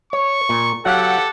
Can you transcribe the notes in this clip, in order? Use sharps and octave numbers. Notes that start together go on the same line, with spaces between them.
C#5 C#6
A#2
F#3 G4 A4 F5 F#5